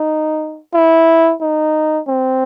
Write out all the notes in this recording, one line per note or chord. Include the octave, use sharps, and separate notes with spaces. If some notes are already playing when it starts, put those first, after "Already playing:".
Already playing: D#4
E4
D#4
C4